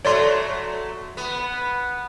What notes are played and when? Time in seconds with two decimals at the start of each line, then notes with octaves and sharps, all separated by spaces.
0.05 F#3 A3 C#5 D5 C6
1.17 B3